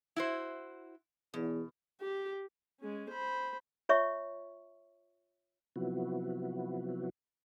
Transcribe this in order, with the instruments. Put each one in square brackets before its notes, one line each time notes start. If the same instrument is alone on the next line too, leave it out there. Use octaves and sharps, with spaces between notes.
[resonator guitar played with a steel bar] E4 F#4 C5
[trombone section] E2 [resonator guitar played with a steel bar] B2
[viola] G4
[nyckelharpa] G#3 C#4
C5 B5
[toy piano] F4 C#5 E5 C#6
[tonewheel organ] C3 F3 F#3 B3 E4 F#4